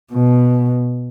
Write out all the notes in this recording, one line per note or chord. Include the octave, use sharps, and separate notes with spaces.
B2